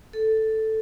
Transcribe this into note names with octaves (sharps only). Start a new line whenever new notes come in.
A4